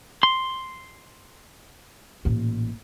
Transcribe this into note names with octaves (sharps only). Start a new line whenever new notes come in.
C6
A1 A#2